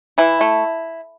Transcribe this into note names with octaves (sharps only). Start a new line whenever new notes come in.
E3 E4
A3